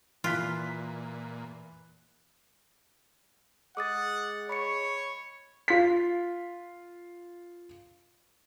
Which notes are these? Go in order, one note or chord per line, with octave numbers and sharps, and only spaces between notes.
A#2 E3 F4 F#6 B6
G#3 F#5 D6 D#6 A6
C#5 B5 C#6 C#7
F4 B6